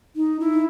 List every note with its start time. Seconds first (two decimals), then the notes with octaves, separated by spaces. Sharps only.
0.15 D#4
0.39 E4